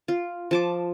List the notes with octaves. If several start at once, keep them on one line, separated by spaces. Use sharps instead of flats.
F4
F3 A5 D6